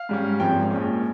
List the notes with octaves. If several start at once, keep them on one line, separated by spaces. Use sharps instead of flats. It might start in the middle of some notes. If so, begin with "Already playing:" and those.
Already playing: F5
G#2 G3 C#4
G#1 G#2 F3 C4 G5
A#1 A#2 G#3 C#4